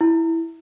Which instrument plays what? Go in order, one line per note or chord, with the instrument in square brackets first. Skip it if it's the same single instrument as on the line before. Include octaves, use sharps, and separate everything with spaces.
[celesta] E4